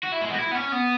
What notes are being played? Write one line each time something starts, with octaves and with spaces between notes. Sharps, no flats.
F#4
E4
G#3
B3
F#4
E4
B3
C#4
B3